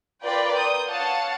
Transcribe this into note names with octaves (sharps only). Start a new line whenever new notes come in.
F4 A#4 B4 D5 G5 B5
D#6 G6
C#5 F5 F#5 A5 A6